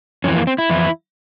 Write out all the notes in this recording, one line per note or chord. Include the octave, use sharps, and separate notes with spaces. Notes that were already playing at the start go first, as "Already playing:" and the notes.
F2 E3 C#4
A#3
C4
E4
F2 E3